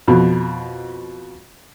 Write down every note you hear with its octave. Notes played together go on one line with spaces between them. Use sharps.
F2 B2